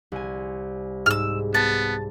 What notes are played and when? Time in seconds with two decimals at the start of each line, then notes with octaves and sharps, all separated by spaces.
0.12 C2 G#5
1.06 G#2 E6 F6
1.54 B3 A5